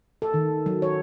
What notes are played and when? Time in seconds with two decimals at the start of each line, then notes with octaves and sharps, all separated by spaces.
0.22 A4
0.34 D#3
0.66 F#3
0.82 C#5